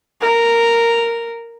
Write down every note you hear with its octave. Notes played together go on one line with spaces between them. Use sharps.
A#4